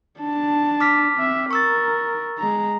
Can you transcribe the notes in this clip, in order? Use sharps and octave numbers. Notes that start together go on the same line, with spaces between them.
D4 A5
D6 F6 B6
C4 E5
A#4 C#6 E6 A6
G#3 A#5